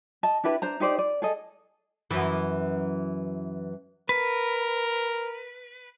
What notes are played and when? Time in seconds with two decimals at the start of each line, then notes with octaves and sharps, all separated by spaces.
0.23 D#5 A5
0.44 D4 E4 G4 B4
0.62 D4 C5 A#5
0.80 D#4 G4 C5 D5
0.99 D5
1.22 G#4 A4 D#5
2.11 F#2 E3
4.09 A#4 B4